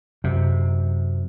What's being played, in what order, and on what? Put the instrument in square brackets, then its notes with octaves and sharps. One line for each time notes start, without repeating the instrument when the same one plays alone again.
[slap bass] F#2 C3